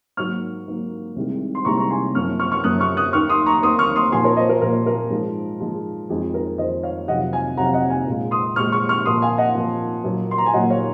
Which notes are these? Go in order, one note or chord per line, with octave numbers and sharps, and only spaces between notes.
G#2 F#3 A#3 C#6 F6
G#2 F#3 A#3
C2 C3 D#3 G#3
C6
C2 C3 D#3 G#3 A#5 C#6
A#5 C#6
G#5 C6
F#2 F3 A#3 C#6 F6
C#6 F6
C#6 F6
F#2 F3 A#3 D#6 F#6
C#6 F6
D#6 F#6
D#2 D#3 A#3 C#6 F6
C6 D#6
A#5 C#6
D#2 D#3 A#3 C6 D#6
C#6 F6
C6 D#6
A#2 F3 A#3 G#5 C6
A#4 C#5
C5 D#5
A#4
A#2 F3 A#3 A#4
A#4
G#2 F3 G#3
G#2 F3 G#3
F2 D#3 G#3 G#4
A#4
F2 D#3 G#3 C5 D#5
C#5 F5
F2 C3 D#3 F#3 D#5 F#5
F5 G#5
F2 C3 D#3 F#3 F#5 A#5
F5
D#5 F#5
F5 G#5
A#2 G#3
C6 D#6
A#2 G#3 C#6 F6
C#6 F6
C#6 F6
A#2 F3 A#3 C6 D#6
F5 G#5
D#5 F#5
A#2 F3 A#3
A#2 F#3 A#3
C6
A#5
G#5
A#2 F#3 A#3 D#5 F#5
C#5 F5